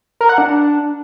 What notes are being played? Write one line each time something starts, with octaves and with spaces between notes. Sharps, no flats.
A#4
F#5
D4